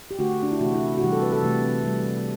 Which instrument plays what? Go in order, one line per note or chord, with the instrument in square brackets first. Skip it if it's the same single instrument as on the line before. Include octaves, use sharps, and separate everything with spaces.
[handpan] G4
D3 A3 F#4
D4
E4
C3 E3 A3 F#4
E4
F#4
C3 E3 G3 G4
A4
B4
A4
C3 E3 A3
C3 G3